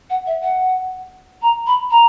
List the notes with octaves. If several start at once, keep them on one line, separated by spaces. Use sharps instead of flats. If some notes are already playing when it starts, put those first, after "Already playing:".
F#5
E5
F#5
A#5
B5
A#5